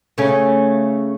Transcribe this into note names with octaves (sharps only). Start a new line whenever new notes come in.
C#3 A3 C#4